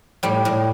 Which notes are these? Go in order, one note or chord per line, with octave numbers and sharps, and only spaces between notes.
A2 G3
A2